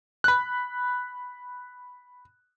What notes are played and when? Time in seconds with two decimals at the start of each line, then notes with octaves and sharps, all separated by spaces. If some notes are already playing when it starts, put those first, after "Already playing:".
0.24 B5 F#6